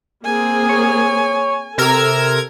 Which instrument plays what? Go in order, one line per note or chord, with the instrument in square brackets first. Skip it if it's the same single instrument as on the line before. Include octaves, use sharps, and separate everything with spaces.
[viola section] A#3 C4 G#4 [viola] G#5
[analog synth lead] C#5
[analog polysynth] C3 A#4 G#6 [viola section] A4 [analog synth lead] E6